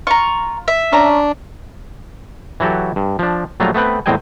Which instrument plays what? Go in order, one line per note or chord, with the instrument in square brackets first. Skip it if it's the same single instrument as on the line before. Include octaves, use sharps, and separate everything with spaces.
[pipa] F4 [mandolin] A#5 C#6
[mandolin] E5
[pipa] C#4 A5 A#5 [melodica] D4
[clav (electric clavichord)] E3 F#3 F#4 G4 A4
G2
F3 D4
A#1 F#3 G3 A3 F4 A#5
A3 B3 C4 B4 G5
E2 A2 C4 D#5 G5 G#5